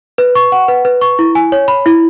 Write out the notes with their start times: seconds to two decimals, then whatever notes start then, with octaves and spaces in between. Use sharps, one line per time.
0.18 B4
0.35 C#6
0.52 F#5
0.68 B4
0.85 B4
1.02 C#6
1.19 E4
1.35 G#5
1.52 C#5
1.68 B5
1.86 E4